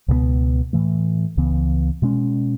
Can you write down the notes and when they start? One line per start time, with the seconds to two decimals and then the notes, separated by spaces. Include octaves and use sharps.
0.08 C#2 B2 G#3 B3
0.73 A2 E3 A3
1.37 C#2 C#3 E3 B3
2.02 B2 G#3 C#4